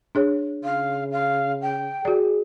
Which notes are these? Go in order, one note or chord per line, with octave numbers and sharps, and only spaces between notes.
D4 G#4 C#5
C#3 F5
F5
G5
F#4 G#4 D5